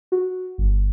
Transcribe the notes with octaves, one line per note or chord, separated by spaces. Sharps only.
F#4
G1